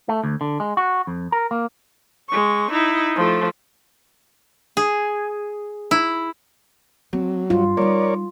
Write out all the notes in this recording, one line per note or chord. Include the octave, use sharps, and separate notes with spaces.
A3
D2
D3
G#3
F#4
F2
A#4
A#3
G#3 C#6
D#4 E4
F3 A3
G#4
E4
F#3 C4
G2 F4
G3 D#4 A#4 C#5 D5